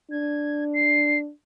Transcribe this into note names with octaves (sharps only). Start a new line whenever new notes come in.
D4 G#6
C7